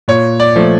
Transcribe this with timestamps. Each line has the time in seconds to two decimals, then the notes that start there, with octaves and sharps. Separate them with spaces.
0.08 A#2 C#5
0.40 D5
0.56 F3 A3